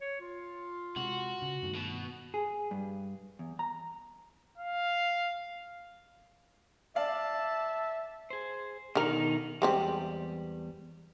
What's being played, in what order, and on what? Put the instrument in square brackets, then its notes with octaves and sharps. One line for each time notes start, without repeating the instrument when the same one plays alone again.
[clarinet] C#5
F4
[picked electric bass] C3 G#3 [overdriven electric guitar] F#4
[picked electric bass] C#3
G2 D#3 A3
[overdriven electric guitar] B2
[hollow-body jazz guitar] G#4
G2
E2
A#5
[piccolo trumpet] F5
[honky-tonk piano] D5 F5 [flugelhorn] E5 [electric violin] A5
[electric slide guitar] G#4 C5
[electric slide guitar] B2 D#3 D#4 [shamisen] D3 A#4
[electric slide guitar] E2 G3 [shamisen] G#3 C4 G4